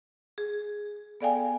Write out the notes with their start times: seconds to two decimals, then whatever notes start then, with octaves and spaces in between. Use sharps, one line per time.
0.38 G#4
1.21 B3 A4 D5 F5 G5 G#5